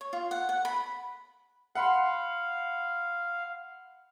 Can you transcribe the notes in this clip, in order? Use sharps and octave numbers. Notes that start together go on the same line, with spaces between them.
C#5
F4
F#5
F#5
B5
F5 F#5 B5 C6